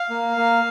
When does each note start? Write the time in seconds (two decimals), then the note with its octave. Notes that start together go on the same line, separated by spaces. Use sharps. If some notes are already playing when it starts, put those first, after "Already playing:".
Already playing: F5
0.10 A#3
0.37 A#3